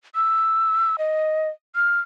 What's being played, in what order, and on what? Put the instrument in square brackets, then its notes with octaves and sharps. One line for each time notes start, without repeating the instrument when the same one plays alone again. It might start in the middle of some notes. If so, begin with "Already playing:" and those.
[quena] E6
D#5
F6